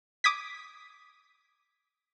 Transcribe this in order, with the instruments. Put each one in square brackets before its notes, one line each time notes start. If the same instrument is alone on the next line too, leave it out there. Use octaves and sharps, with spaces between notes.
[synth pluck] D6 D#6 G#6 B6